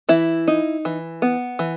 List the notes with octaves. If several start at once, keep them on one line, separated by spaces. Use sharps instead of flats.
E3 E4
D#4
E3
B3
E3